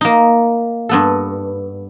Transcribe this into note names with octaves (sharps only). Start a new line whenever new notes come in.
A#3 D#4
G2 B3 A4